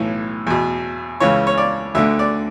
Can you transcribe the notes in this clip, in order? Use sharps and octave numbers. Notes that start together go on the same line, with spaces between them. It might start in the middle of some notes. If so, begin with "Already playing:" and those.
Already playing: B1 A2 E3
E2 B2
C#2 C#3 E3 C#5
C#5
D5
D2 D3 E5
D5